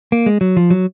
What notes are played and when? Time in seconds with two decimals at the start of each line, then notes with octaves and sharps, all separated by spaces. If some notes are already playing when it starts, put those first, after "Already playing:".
0.12 A#3
0.26 G#3
0.41 F#3
0.57 F3
0.70 F#3